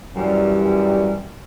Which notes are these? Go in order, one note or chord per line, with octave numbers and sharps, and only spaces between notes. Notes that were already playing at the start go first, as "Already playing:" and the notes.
F#2 E3 G3